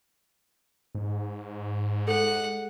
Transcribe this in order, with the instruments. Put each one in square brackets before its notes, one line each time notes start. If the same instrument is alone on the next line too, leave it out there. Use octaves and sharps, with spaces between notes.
[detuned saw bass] G#2
[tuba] G#3 [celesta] A4 [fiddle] F#5